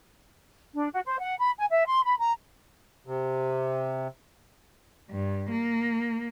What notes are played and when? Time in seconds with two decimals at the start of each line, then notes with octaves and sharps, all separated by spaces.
0.75 D4
0.93 F#4
1.05 C5
1.20 F#5
1.40 B5
1.58 G#5
1.71 E5
1.87 C6
2.04 B5
2.19 A#5
3.07 C3
5.10 G2
5.51 A#3